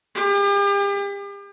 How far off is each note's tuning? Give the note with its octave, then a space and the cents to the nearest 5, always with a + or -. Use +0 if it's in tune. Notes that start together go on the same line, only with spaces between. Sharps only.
G4 +40